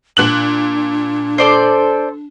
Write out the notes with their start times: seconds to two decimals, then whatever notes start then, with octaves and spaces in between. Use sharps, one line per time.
0.17 A#2 D4 F#6 F#7
1.38 A4 C5 D5 C6